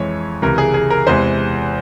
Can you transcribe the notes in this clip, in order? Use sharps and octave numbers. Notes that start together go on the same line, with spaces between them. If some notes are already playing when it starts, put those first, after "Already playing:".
Already playing: F2 E3 G#3 C#5
C#2 C3 E3 A#4
G#4
G#4
A#4
E2 C3 E3 G#3 C5